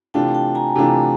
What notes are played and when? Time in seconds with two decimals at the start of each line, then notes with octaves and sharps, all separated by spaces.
0.14 C3 E3 A3 D4 F4 G5 A5
0.35 G5 A5
0.55 G#5 A#5
0.76 C3 E3 A3 D4 F4